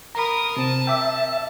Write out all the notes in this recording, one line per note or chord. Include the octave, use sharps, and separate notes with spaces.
A#4 A#5 B5 D#6
C3 C4 A5
E5 G5 D6 E6